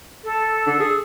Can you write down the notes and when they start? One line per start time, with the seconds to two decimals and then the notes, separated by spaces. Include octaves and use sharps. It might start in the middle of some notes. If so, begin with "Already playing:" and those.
0.24 A4
0.66 D3
0.80 G#4